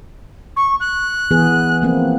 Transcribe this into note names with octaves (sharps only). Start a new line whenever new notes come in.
C#6
F#6
E3 B3 G#4
F3 A#3 C4